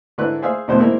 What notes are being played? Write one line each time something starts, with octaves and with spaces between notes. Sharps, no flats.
G#2 D3 E4 B4 F#6
G#4 C5 E5 F5
B1 E2 A2 D3 C5
G#3 A#3 C4 E4